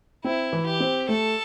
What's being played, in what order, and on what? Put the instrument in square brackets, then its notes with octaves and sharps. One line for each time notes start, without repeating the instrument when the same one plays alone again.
[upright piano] C4 [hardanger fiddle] E4
[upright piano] E3
[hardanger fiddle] G4
[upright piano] C4
[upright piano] A3 [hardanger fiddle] A4